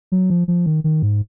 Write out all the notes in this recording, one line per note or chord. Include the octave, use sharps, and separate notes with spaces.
F#3
F3
F3
D#3
D#3
G#2